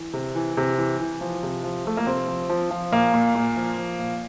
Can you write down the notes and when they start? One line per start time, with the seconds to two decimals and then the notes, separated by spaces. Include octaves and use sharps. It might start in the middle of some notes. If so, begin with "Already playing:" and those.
Already playing: E3
0.13 C3
0.35 E3
0.57 C3
0.78 E3
1.00 E3
1.21 F3
1.43 C3
1.64 F3
1.85 F3 A3
1.97 A#3
2.07 C3 C4
2.28 F3
2.49 F3
2.71 F3
2.92 A#2 A#3
3.14 A#2
3.35 A#2
3.56 F3
3.78 F3
3.99 A#2